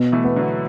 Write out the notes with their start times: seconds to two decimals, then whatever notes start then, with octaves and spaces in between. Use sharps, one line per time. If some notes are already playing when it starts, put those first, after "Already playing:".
Already playing: B2
0.12 E3 A3
0.24 B3
0.36 D3 F#3